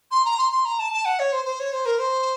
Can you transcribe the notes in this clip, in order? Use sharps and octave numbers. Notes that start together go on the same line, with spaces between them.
C6
A#5
C6
C6
A#5
A5
A5
F#5
C#5
C5
C5
C#5
C5
A#4
C5